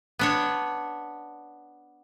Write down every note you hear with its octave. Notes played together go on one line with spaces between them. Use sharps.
B3 D4 C#5